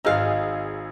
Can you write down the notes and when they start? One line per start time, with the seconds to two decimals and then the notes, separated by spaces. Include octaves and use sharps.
0.05 G#1 D#4 G#4 F5 E6